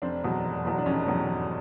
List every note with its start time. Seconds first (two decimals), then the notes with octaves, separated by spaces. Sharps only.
0.02 F1 C4 D4
0.23 E2 B2 F#3
0.44 F1
0.64 E2 B2 F#3
0.78 D4
0.86 F1 C#4 D#4
1.07 E2 B2 F#3
1.27 F1